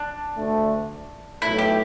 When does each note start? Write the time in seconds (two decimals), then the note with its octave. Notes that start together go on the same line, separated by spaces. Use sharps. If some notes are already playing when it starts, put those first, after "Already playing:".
Already playing: D4
0.37 D2 D3 A3
1.41 B1 A2 A3 E4
1.58 G4